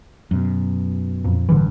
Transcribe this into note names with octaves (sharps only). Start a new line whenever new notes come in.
F#2 B2
F2 A#2
A1 G2 D3 E3